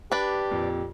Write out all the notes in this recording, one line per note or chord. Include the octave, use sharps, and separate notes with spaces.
D4 G4 B4
F2 A#2